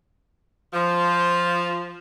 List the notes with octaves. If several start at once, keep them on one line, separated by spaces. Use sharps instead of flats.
F3